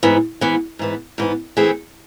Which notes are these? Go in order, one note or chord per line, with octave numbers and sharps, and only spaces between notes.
G#2 E3 B3
G#2 E3 B3
G#2 E3 B3
G#2 E3 B3
E3 A3 C4 G#4